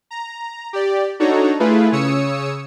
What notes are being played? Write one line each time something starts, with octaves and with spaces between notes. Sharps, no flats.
A#5
G4 D5
D4 D#4 F#4 A4 C#5 A#5
A3 E4 F4 G#4 B4
C#3 C#5 D#6 E6 C#7